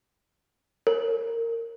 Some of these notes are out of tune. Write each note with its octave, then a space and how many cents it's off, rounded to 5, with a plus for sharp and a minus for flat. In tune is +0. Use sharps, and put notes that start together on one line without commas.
A#4 -20 C#5 -30